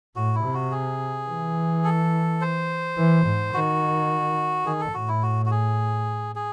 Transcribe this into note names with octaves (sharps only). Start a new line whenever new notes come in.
A2 F#4
E4
C3
F#4
G#4
E3
A4
C5
E3
G#2
D#3 F#4
D#3 G#4
A4
A2 F#4
E4
F#4
F#4
G#4
G#4